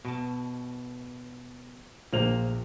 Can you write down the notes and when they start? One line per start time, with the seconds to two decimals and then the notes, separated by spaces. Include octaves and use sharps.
0.05 B2 A5
2.13 A#1 A#3 C5 F7